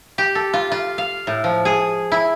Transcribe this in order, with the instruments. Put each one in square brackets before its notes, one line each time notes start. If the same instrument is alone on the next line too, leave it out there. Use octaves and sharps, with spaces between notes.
[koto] G4
A4
F4
F4
F5
A2
F3
G#4
E4